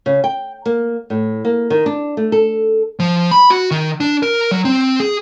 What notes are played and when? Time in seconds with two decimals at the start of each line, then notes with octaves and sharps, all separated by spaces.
0.06 C#3
0.24 G5
0.66 A#3
1.10 A2
1.45 A#3
1.70 D#3
1.86 D4
2.17 A3
2.32 A4
3.00 F3
3.31 B5
3.50 F#4
3.71 D#3
4.00 D4
4.23 A#4
4.51 F#3
4.65 C4
5.00 G#4